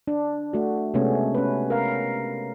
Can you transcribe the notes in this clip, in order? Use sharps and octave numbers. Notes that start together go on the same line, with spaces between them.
D4
A3 F#4
C3 G#3 A3 B3 C#4
C#4 B4
A#4 F5